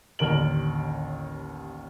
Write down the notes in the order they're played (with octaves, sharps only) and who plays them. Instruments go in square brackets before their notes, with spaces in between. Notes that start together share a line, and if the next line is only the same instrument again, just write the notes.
[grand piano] A1 D#2 D3 A#4 D7 F#7